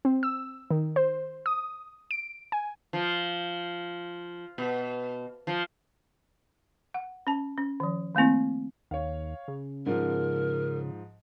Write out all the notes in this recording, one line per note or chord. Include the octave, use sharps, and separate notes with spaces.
C4
E6
D#3
C5
D#6
D7
G#5
F3
B2
F3
F#5
C#4 A5
C#4
D#3 F3
D#3 A3 A#3 C4 E4
D#2 C#5 F5
C#3
G#2 F3 A#4